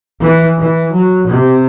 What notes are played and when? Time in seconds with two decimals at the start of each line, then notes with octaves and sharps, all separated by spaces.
0.20 E3
0.58 E3
0.93 F#3
1.28 C3